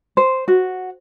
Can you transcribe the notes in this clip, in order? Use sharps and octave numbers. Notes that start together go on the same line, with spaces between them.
C5
F#4